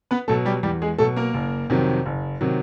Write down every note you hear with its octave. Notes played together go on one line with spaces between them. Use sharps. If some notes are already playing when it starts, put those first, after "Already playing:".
B3 B4
B2 F#3 A3 A4
G3 G4
E2 G3 G4
G#3 G#4
B2 F#3 A3 A4
A#3 A#4
F#1
F2 C3 D#3 F#3
F#1
C3 D#3 F#3